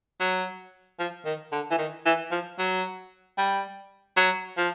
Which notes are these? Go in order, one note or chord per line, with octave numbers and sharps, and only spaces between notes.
F#3
F3
D#3
D3
E3
D#3
E3
F3
F#3
G3
F#3
F3